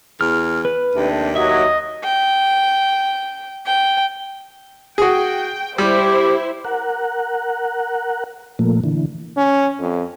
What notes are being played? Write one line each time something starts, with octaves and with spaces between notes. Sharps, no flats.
E2 F6
B4
D#2 C3 A3 D4
F#3 D#5 E5
G5
G5
F#4 G#4 G5
G3 E4 G4 C5
A#4 F#5
A#2 F3 A3 A#3
D3 E3
C#4
F2